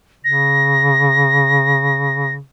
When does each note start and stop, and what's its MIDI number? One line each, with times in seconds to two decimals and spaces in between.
0.25 2.39 49
0.25 2.34 94